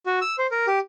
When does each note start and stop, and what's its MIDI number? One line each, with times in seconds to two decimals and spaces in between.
0.06 0.19 66
0.22 0.36 88
0.38 0.47 72
0.51 0.66 70
0.67 0.79 67